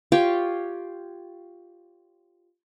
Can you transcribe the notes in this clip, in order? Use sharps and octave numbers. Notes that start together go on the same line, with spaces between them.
F4 G4 C#5 G5